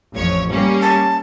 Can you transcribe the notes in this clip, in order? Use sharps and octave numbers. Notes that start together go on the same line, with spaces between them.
A1 F2 C#5
G3 A#3 C#4
A5